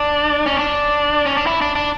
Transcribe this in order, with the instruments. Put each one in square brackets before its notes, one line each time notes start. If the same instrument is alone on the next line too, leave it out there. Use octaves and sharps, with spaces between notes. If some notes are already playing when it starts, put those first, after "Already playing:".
Already playing: [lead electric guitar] D4
C#4
D4
C#4
D4
E4
D4
D4